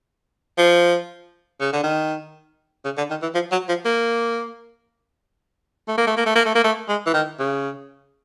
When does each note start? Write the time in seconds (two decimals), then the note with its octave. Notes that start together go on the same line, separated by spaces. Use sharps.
0.58 F3
1.61 C#3
1.73 D3
1.84 D#3
2.85 C#3
2.98 D3
3.10 D#3
3.22 E3
3.35 F3
3.52 F#3
3.69 F3
3.85 A#3
5.88 A3
5.98 A#3
6.07 A3
6.17 A#3
6.26 A3
6.35 A#3
6.46 A3
6.55 A#3
6.64 A3
6.89 G#3
7.06 E3
7.14 D#3
7.39 C#3